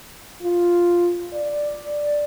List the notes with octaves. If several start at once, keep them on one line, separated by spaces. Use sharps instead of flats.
F4
D5